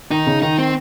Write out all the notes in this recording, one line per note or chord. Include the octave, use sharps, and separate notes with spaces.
D#3 D#4
C#3
D#3 D#4
C4